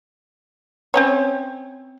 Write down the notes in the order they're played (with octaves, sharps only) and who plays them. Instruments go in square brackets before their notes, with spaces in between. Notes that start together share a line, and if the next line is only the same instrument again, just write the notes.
[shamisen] C4 C#4 C#5